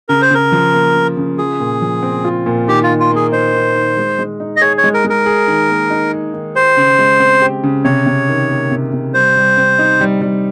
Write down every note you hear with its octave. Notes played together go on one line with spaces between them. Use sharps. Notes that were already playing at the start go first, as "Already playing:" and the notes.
C#3 A#4
C5
C#3 A#4
F3
A#3
C#3
C#3
F4 G#4
A#2
F3
C4
F4
A#2
D#3 G4
F4
D#3
F4
A#3 G#4
D#4 C5
D#3
D#3
G#3
G#3
D#4
D#5
G#4 C#5
C#5
G#3
A#4
G#3
A#4
G#4
D#3
A#3
D#4
G#4
D#3
G4 C5
C#3
G#3
C4
G4
C#3
C3 C#5
C3
D#3
A#3
C3
C3
G3 C5
G3
C4
D#4
G3
G3